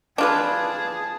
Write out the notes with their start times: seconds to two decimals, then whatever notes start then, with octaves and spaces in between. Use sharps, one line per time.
0.18 D4 F4 G#4 B4 A5